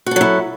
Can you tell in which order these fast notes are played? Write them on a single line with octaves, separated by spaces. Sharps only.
F#4 A4 F#3 E4